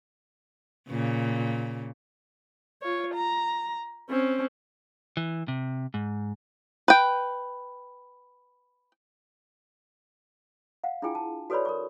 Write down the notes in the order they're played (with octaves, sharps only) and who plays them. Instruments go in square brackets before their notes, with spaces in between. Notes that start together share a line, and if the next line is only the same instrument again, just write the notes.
[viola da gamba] A#2 C#3
[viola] F4 C#5
A#5
C4 C#4
[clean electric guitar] E3
C3
G#2
[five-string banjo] B4 G5
[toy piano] F5 F#5
D4 E4 F4 G#4 G5 G#5
A5
F#4 A4 B4 C#5 D5 B5
A#4 B5 C#6